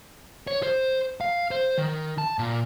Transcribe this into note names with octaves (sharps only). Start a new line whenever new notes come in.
C#5
C5
F5
C5
D#3
A5
A#2